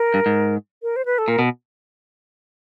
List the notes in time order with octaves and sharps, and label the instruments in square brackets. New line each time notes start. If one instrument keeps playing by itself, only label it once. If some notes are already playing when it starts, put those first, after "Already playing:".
Already playing: [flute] A#4
[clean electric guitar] G2
G#2
[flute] A#4
C5
B4
A4
[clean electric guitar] A#2 [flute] A#4
[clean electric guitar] B2